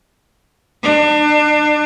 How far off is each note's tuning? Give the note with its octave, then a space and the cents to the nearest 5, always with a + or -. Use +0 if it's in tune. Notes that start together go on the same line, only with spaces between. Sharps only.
D4 +30